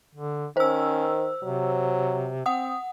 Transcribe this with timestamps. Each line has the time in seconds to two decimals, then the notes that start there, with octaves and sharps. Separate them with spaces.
0.15 D3
0.57 D#3 C#4 C5 E6
1.43 C3 F#3
2.46 C4 F#5 D#6